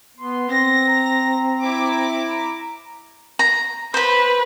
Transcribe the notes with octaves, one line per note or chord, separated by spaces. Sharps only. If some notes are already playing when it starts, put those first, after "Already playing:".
B3 C6
C4 A#6
A#5
E4 D6
A#5
B4 C5 B5